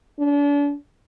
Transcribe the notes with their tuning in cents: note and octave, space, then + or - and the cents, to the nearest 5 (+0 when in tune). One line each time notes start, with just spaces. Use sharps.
D4 -40